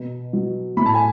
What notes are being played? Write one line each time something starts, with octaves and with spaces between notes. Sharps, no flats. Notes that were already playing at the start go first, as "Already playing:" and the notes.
Already playing: B2
F#3
A2 B5
A5
G#5